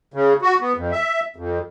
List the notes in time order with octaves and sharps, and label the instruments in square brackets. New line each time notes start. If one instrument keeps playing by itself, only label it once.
[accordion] C#3
F#4
B3
F2
E5
F2